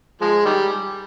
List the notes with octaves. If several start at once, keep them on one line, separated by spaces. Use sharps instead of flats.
F3 G#3
D#3 G3